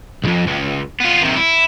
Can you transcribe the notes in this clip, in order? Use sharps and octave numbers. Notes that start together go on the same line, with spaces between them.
B1 F2
C#2
B3 F4
C3 D#3
E4